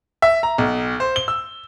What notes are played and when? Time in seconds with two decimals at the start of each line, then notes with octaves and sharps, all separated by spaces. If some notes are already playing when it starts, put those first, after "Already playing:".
0.22 E5
0.43 A#5
0.58 B1
1.00 C5
1.16 G7
1.28 E6